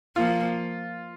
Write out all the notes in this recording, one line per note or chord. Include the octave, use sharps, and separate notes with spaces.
F3 A#3 F4